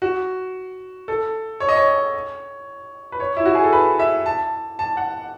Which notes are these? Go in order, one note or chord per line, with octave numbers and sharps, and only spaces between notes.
F#4
A4
C#5
D#5
C#5
B4
C#5
E4
F#4
G#4
A4
B4
E5
A5
A5
F#5